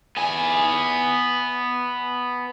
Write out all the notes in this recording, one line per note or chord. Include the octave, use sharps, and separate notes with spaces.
B3 G#5